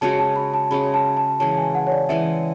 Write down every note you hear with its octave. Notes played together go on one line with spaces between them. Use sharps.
C#3 G#3 C#4 F#4 A5
A5
B5
A5
C#3 G#3 C#4 F#4 B5
A5
A5
C#3 E3 G#3 A5
G#5
F#5
C#5
D5
C#3 E3 G#3 E5